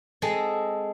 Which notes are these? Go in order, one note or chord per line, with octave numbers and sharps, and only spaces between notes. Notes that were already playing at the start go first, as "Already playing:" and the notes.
G#3 C4 G#4 A4 D#5